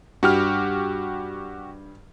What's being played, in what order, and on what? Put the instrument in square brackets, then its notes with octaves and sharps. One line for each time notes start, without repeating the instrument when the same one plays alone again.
[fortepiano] G2 [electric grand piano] F#4 G4 F6